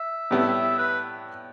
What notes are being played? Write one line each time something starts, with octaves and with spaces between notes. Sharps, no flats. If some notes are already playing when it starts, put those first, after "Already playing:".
Already playing: E5
A2 G3 B3 E4
B4